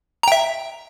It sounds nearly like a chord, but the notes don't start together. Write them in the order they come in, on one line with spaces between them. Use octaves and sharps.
A#5 G5 E5